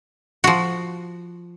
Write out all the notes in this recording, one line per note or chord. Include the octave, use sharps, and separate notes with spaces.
F3 F#4